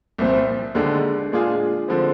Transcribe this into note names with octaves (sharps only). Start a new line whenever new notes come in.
C2 A#2 F3 C4
D#2 D3 G#3 D4
A#2 G#3 D4 F4 G#4
D3 F3 G#3 C4